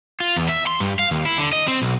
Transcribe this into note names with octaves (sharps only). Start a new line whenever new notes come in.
F4
E2
E5
C6
G2
F5
D#2
E4
D3
D#5
C4
B1